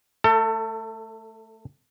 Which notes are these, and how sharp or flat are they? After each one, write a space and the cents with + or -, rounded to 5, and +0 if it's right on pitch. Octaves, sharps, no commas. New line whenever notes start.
A3 +0 A4 +30